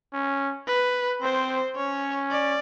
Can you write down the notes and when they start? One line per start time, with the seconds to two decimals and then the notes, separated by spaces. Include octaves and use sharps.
0.13 C#4
0.67 B4
1.22 C4 C5
1.76 C#4 C#5
2.31 D5